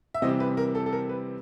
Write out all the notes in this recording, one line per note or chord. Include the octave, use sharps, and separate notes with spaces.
E5
C3 E3 G3 C4 D#5
B4
A#4
A4
A4
A#4
B4